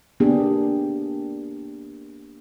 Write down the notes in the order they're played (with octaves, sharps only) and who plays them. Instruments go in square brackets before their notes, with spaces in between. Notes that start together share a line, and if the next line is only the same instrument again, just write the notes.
[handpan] A#3 B3 D4 G4 G#4